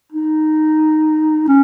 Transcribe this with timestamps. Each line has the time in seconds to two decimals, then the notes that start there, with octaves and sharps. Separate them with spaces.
0.12 D#4
1.48 C#4